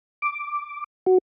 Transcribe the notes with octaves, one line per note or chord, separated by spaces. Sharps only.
D6
F#4